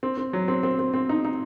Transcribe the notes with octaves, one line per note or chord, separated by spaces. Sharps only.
C4
C4
F#3
C4
C4
C4
C4
D#4
D#4